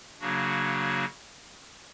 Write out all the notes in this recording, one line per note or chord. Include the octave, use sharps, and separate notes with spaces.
C#3 F#3 A#3 D4 F#4